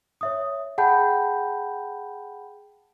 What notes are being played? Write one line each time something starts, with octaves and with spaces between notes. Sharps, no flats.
C#5 E5 D#6
G#4 F#5 G5 A5 B5 G6